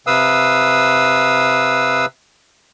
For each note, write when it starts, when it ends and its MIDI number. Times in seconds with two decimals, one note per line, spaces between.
0.07 2.06 48
0.07 2.06 71
0.07 2.06 77
0.07 2.06 87
0.07 2.06 88